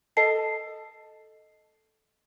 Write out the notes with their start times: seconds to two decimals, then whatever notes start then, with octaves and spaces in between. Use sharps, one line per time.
0.17 A4 D#5 A5 C7